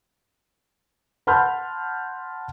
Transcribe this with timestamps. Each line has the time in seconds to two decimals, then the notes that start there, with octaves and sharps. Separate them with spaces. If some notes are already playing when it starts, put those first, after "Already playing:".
1.27 F#5 A5 B5 C6 F6 G6